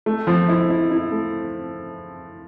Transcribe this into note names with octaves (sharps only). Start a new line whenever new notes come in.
A3
F3
E4
E4
E4
A3